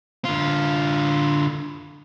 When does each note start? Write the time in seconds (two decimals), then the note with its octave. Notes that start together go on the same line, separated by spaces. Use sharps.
0.25 D3 F4